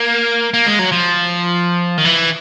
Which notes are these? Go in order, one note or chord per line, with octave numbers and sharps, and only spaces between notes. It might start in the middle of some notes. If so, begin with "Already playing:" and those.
Already playing: A#3
A#3
G#3
F#3
F3
D#3
E3